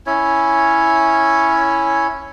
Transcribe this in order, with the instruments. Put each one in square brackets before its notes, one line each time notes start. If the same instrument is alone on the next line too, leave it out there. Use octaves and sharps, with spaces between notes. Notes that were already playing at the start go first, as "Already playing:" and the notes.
[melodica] C#4 E4 C#5